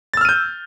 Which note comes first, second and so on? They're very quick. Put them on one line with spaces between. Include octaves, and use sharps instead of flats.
A6 E6 F6 D#7 G6